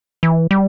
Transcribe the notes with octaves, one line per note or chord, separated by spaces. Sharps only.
E3
G3